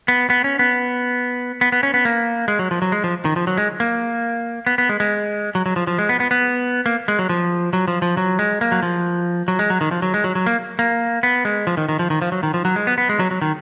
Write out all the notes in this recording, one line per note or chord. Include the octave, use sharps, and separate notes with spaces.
B3
B3
C#4
B3
B3
B3
C#4
B3
A#3
G#3
F#3
F3
F#3
G#3
F3
D#3
F3
F#3
G#3
A#3
B3
B3
G#3
G#3
F#3
F#3
F3
F3
G#3
B3
B3
B3
A#3
G#3
F#3
F3
F#3
F3
F3
F#3
G#3
A#3
F#3
F3
F#3
G#3
F#3
D#3
F3
F#3
G#3
F#3
F#3
A#3
A#3
B3
G#3
F3
D#3
D#3
F3
D#3
F3
F#3
D#3
F3
F#3
G#3
B3
B3
G#3
F#3
F#3
D#3